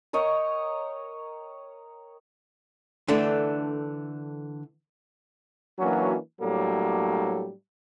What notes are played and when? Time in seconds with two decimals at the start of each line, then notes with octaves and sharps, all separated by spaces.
0.13 A#4 C#5 D#5 G5
3.08 D3 E3 A3 D4
5.79 E3 F#3 A#3 C#4 D4 F#4
6.41 A2 F#3 G3 A#3 D4 A4